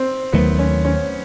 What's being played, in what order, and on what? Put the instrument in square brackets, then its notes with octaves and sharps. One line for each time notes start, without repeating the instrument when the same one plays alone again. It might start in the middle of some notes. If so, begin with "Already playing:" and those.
Already playing: [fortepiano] C4
[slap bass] D#2 D#3 F#3 A3 [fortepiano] B3
[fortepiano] C#4
C#4